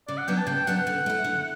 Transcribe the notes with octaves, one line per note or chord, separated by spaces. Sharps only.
C#3 D5
F#5
F#3 B3 D4 G5
A5
C#3 G5
F#3 B3 D4 F#5
D3
A3 E4
D3